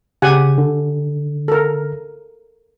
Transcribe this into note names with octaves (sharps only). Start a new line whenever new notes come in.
C#3 G4 F#5 G#5
D3
A4 A#4